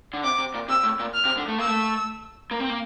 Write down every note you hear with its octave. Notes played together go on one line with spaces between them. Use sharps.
D3
C3 D6
C3
A#2
C3 E6
A2
A#2
F6
C3
D3
A3
A#3 E6
A3
A#3
C4
A#3